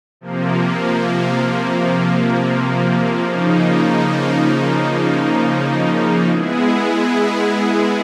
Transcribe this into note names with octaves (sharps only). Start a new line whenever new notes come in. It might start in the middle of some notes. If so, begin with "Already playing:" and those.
C3 F3 A#3
C#3 F3 A#3 D#4
G#3 B3 E4 G#4